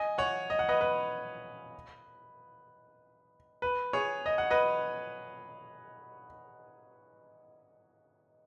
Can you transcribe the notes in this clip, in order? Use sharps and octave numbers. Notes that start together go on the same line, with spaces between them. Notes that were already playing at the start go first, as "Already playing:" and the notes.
Already playing: D#5 G#5
C#5 F#5
D#5
F#5
B4 D#5
B4
B4
G#4 C#5
D#5
F#5
B4 D#5